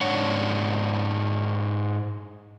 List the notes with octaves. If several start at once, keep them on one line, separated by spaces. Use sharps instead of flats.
G#2 D4 C#5 F#5